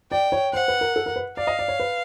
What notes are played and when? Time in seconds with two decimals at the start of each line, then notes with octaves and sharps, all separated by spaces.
0.11 D5 G5
0.32 C#5
0.53 C5 F#5
0.68 B4
0.81 A#4
0.96 A4
1.06 A#4
1.16 B4
1.37 D5 F5
1.47 D#5
1.59 D5
1.68 C#5
1.80 B4